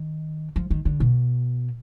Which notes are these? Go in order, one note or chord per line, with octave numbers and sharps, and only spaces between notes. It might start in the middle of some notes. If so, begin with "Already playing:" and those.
Already playing: D#3
F3
D#3
D3
B2